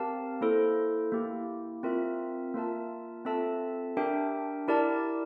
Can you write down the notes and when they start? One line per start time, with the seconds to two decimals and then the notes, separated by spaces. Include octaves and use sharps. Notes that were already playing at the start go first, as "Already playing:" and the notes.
Already playing: C4 G4 A#4 F5 A5
0.41 A#3 E4 A4 C5
1.12 A#3 E4 G4
1.83 C4 F4 A#4 E5
2.54 A#3 F4 A#4 E5 A5
3.25 C4 F4 A4 E5 A5
3.97 D4 G4 A#4 E5 G5
4.68 E4 G4 A#4 D5 A5